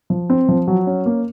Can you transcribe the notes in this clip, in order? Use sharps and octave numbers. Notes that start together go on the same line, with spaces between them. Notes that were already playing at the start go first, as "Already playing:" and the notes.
F3
C4
F3
F#3
C#4
A#3